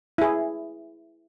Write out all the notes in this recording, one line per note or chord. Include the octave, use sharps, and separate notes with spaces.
E4 G#4